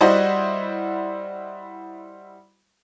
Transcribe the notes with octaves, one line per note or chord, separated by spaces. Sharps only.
G3 E4 F#4 C5 D#5 F#5